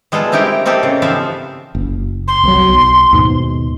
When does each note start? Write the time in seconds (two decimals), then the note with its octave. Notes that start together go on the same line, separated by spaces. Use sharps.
0.12 G3 G#3 B3 F4 A4
0.32 C4 D#4 E4 G4 A#4
0.66 A#3 C4 D#4 G4 A4
0.83 C#3
1.02 E3 F3 B3 C4 E5 F5
1.75 F#1
2.28 C6
2.43 C2 F3 F#3
2.68 B1
3.13 D#2 G#2 B2